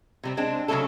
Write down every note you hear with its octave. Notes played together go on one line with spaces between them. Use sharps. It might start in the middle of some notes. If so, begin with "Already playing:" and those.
C3 G3 C4
G#3 C4 D4
C#3 F#3 G#3 A3 C#4 A4